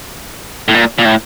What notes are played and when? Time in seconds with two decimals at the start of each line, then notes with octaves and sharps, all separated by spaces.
0.68 A2
0.74 A#2
0.98 A#2
1.05 A2